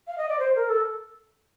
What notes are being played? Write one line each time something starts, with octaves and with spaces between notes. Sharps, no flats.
F5
D#5
D5
C5
A#4
A4